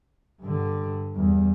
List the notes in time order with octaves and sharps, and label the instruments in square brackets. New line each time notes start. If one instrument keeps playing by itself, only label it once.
[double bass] G2 D3
[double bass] E2 [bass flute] G3